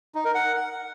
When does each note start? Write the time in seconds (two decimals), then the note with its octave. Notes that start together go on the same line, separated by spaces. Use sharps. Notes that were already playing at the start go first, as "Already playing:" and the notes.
0.15 D#4
0.25 A#4
0.35 F#5